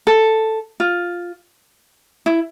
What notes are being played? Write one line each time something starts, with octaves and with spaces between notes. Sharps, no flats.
A4
F4
E4